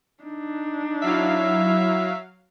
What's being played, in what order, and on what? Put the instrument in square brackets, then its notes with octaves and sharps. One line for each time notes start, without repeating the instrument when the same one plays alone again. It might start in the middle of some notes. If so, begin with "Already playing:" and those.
[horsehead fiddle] D4 D#4
[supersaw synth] F#3 F5 [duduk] E4 [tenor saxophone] E5